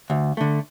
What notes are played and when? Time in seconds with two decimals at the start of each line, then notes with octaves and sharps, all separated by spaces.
0.10 D2
0.37 D3 A3